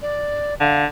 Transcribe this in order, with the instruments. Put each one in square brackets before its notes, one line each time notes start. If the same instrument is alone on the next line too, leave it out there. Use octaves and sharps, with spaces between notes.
[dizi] D5
[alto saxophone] D3 [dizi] F5